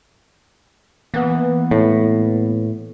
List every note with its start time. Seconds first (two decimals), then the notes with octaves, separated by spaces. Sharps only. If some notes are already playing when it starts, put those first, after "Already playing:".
1.14 E3 A#3 B3
1.71 A2